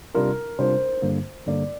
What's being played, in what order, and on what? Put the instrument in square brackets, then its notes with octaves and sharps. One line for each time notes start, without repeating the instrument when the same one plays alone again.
[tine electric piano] C3 G3 D4 F4 [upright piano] A#4
[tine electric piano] C3 G3 D4 F4 [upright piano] C5
[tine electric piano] G2 D3 G3 A#3
[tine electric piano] G2 D3 G3 A#3 [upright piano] D5